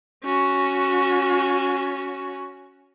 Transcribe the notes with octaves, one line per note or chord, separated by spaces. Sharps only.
C#4 F#4